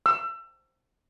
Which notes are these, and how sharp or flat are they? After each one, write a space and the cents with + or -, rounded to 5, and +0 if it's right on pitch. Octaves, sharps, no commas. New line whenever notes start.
E6 +30